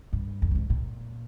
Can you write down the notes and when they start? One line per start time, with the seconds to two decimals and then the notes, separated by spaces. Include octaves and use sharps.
0.13 G2
0.42 F2
0.51 G2
0.55 G#2
0.70 A#2